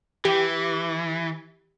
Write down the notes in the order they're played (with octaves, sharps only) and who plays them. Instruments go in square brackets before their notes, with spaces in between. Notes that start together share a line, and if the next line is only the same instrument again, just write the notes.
[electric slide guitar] E3 [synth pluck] G4